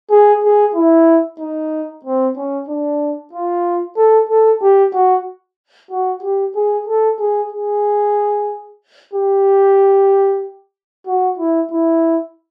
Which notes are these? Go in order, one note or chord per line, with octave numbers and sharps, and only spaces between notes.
G#4
G#4
E4
D#4
C4
C#4
D4
F4
A4
A4
G4
F#4
F#4
G4
G#4
A4
G#4
G#4
G4
F#4
E4
E4